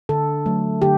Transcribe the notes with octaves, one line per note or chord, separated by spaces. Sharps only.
D3 A4
F#3 A3
D3 G4